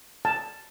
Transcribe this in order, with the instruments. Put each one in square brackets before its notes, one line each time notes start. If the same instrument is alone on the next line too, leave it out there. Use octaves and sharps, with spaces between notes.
[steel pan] A5